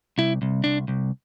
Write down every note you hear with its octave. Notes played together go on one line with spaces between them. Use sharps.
C2 E4
C2
C2 D4
C2